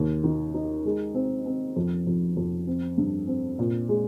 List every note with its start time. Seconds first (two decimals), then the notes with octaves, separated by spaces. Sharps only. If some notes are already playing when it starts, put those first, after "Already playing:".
Already playing: D#2
0.24 D#3
0.54 D#4
0.85 G#3
1.14 C4
1.46 C4
1.76 F2
2.07 F2
2.37 F2
2.67 C4
2.98 G2
3.27 C4
3.59 A#2
3.89 G#3